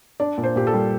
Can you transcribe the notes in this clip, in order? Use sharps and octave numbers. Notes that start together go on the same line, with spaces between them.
D4 D5
A#2
C5
A#2 G4
A4
G3